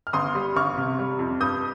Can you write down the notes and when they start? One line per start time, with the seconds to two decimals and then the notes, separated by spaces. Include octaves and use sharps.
0.07 F6
0.13 G1 C6 D#6
0.35 G3
0.56 G1 C#6 F6
0.77 C3
0.99 G3
1.19 F2
1.40 G2 D#6 G6